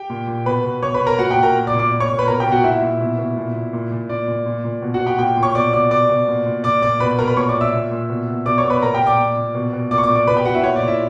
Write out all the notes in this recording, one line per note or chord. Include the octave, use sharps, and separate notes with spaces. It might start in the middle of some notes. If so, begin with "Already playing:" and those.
Already playing: G4 G5
A#2
A#2
B2 B4 B5
B2
B2 C#5 C#6
B4 B5
B2
A#4 A#5
A#2 F#4 F#5
G4 G5
A#2
A#4 A#5
A#2
D5 D6
A#2
D5 D6
A#2
C#5 C#6
A#2
B4 B5
B2 A#4 A#5
G4 G5
B2
F#4 F#5
A#2 E4 E5
A#2
B2
B2
A#2
A#2
A#2
A#2
A#2 D5
A#2
A#2
A#2
B2
F#4 F#5
B2
G4 G5
A#2 G4 G5
A#2
C#5 C#6
B2 D5 D6
B2 D5 D6
B2 D5 D6
B2
A#2
A#2
A#2 D5 D6
A#2 D5 D6
B2 B4 B5
B2 A#4 A#5
B4 B5
A#2 C#5 C#6
D5 D6
A#2
E5 E6
A#2
A#2
B2
B2
B2 D5 D6
C#5 C#6
B2
B4 B5
A#2 A#4 A#5
G4 G5
A#2
D5 D6
A#2
A#2
B2
B2
A#2 D5 D6
C#6
D5 D6
A#2
D5 D6
B2 B4 B5
G4 G5
B2 F#4 F#5
E4 E5
A#2 C#5
D5
A#2
E4 E5